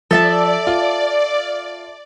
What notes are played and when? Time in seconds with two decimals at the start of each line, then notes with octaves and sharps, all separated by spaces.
0.11 F3 A4 D5 E5 A5
0.67 F4